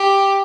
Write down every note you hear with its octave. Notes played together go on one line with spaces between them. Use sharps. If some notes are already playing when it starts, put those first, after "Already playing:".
Already playing: G4